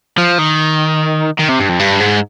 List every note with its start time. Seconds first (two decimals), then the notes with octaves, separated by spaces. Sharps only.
0.18 F3
0.39 D#3
1.39 D#3
1.49 C3
1.60 G2
1.69 F2
1.79 G2
2.00 G#2